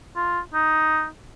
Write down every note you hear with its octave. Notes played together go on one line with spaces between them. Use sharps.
F4
D#4